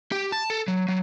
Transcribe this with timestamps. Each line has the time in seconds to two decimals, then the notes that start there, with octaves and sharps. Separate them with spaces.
0.12 G4
0.32 A5
0.50 A4
0.68 F#3
0.88 F#3